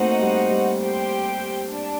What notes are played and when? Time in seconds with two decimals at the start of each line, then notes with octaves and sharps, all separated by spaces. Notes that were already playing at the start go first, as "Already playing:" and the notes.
Already playing: A3 A#3 C4 D#4 F#4 C5 F#5
0.21 G3
0.51 G3
0.81 G4 C5 G5
1.69 D4